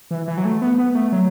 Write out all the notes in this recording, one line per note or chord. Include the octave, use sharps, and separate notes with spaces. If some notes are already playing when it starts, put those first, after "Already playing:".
E3
E3
F#3
A3
B3
B3
A3
F#3